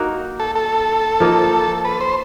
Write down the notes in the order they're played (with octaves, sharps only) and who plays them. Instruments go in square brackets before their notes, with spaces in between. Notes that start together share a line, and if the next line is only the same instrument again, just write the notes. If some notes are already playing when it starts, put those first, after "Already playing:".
Already playing: [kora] A#3 D#4 F#4 A#4
[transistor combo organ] A4
A4
[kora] F3 A#3 D#4
[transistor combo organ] B4
C5